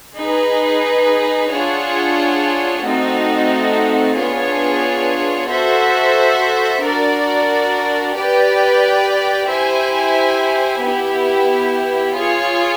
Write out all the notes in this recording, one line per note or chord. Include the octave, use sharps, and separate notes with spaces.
D#4 G#4 B4
D4 F4 G#4 C#5 F#5
A3 C4 D#4 F#4
B3 D4 F4 G#4 C#5
F#4 A4 C5 E5
D4 F#4 A#4 D5
G4 B4 D5 G5
E4 G4 C5 E5 G#5
B3 E4 G4
F4 G#4 C#5